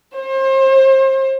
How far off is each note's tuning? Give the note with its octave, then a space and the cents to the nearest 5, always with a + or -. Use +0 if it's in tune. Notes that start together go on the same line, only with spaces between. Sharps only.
C5 +35